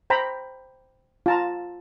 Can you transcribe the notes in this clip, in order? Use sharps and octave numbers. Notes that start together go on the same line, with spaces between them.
C5 G5 A#5 B5
F4 A5 A#5